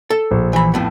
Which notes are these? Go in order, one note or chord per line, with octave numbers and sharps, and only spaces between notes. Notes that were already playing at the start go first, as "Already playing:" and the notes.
A4
A#1
E3 B5
F2 A2 B3